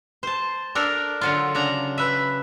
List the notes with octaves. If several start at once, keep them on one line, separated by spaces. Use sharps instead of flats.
C5 A5
D4 A4 A#4
D3 F#3 F4
C#3 D4 A#5
B4 E5